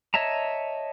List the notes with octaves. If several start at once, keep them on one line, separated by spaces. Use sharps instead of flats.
C#5 D#5 E5 A5 A#5